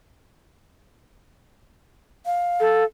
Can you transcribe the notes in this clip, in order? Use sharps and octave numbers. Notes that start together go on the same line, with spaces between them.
F5
A4